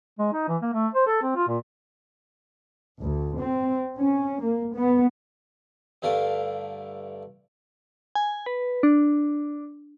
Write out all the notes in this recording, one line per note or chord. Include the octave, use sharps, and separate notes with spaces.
G#3
D#4
E3
A#3
A3
C5
A4
C4
F4
A#2
D2
C4
C#4
A#3
B3
G2 D3 A3 A#4 F5
G#5
B4
D4